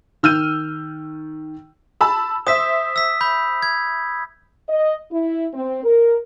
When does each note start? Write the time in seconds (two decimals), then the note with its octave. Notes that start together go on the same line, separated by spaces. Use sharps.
0.23 D#3 E6 F6 G6 D#7
2.01 A5 B5 E6
2.47 C5 E5 D#6 B6
2.96 E6 B6
3.21 B5 G6
3.62 G#6
4.69 D#5
5.11 E4
5.54 C4
5.84 A#4